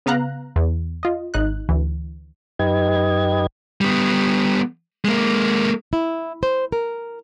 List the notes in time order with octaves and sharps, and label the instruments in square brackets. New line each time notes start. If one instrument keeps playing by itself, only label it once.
[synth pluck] C#3 B3 F5 A#5 F#6
E2
F4 D#5
G#1 D#4 F#6
D2 E3
[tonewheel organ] F#2 D#4 G4 B4 D#5 G#6
[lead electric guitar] G3 B3
G#3 A#3
[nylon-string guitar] E4
C5
A#4